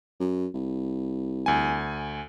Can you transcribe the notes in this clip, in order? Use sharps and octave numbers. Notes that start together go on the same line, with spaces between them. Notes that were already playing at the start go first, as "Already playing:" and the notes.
F#2
C2
D2 G#5